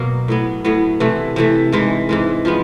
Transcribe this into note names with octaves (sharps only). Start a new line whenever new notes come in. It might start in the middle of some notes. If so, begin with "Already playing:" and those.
Already playing: B2 F#3 A#3
A2 F#3 B3
A2 F#3 B3
C3 E3 A3
C3 E3 A3
G#2 E3 G#3
G#2 E3 G#3
F3 G#3 B3